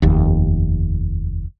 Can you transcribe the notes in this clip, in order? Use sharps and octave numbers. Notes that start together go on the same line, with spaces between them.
F1 D#2